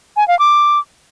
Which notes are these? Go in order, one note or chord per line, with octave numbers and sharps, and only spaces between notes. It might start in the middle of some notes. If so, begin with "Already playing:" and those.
G#5
F5
D6